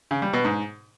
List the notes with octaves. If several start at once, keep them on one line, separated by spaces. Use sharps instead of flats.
C#3
G3
B2
G#2